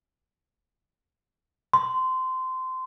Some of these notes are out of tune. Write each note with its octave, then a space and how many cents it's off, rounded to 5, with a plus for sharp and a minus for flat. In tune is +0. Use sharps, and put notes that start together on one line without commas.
C6 -20